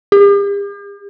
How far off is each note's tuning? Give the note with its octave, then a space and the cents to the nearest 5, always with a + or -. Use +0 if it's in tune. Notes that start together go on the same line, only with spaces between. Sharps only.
G4 +45